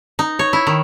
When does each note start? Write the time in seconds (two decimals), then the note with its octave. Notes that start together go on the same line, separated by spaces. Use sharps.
0.19 D#4
0.39 C#5
0.53 E4
0.67 D#3